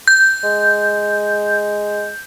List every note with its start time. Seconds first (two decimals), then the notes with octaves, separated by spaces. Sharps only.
0.08 G6
0.44 G#3